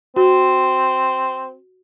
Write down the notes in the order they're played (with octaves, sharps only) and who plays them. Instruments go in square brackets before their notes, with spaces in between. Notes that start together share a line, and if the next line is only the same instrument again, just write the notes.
[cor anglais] C4 [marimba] F#4